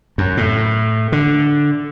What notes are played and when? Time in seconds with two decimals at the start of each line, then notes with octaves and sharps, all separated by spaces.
0.18 F#2
0.37 A2
1.12 D3